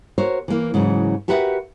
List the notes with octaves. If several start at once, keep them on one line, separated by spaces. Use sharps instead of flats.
F#4 A#4 C5 C#5
E3 A#3
G#2 C#3 E3 F#3
F#4 G4 A#4 B4 E5 F#5